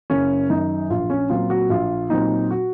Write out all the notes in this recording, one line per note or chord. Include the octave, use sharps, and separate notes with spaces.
F#1 C#4
F#2 D#3 D#4
A#1 F4
C#4
A#2 F#3 C4 F4
F#4
A#1 F4
A#2 F#3 C4 D#4
F#4